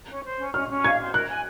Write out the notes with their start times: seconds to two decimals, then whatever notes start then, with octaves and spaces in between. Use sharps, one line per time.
0.08 C#4
0.24 C5
0.38 C#4
0.54 C#4 F6
0.69 C#4
0.84 F5 G#6
1.00 C5
1.14 A#4 F#6
1.30 G#5